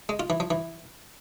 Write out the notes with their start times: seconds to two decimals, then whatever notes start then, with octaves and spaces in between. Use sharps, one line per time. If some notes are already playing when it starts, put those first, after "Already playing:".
0.09 G#3
0.20 F4
0.30 E3
0.40 F3
0.50 E3